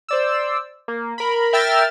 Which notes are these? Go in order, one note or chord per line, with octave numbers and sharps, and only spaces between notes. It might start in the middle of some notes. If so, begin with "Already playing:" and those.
C5 D5 E6
A#3
A#4 B5
A#4 E5 G5 E6 F6 A6